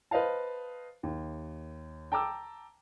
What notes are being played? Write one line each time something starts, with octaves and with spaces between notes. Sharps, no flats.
B4 C5 D#5 F5 A5
D#2
G5 A5 A#5 D6 E6